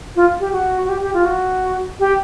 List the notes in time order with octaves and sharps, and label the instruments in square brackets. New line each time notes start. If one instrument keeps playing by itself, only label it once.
[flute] F4
G4
F#4
F#4
G4
G4
F4
F#4
G4